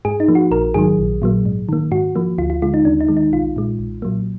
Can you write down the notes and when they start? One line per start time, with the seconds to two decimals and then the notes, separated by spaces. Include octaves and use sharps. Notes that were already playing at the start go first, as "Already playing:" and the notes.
0.05 G#2 G#4
0.20 D#4
0.28 F3 A#3
0.35 F#4
0.51 A#1 A#4
0.74 G#2 D#3 F#3 G#4
0.98 A#1
1.22 A#2 F#3 A#3
1.45 G#2
1.69 D#3 A#3
1.91 G#2 F#4
2.16 F3 A#3
2.38 D2 F4
2.50 F4
2.62 D3 G#3 F4
2.74 D#4
2.85 D#2 D4
3.01 D#4
3.08 D#3 G#3
3.17 D#4
3.32 B1 F4
3.56 A#2 G#3
3.79 B1
4.02 A#2 F#3 A#3